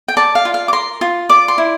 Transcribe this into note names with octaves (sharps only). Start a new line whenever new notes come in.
G5
D5 A5
F5
F4
F5
D6
A#4 C6
F4
D5 D6
C6
E4